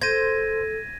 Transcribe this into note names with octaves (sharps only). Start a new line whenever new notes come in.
A4 C5 G#6 A#6 D#7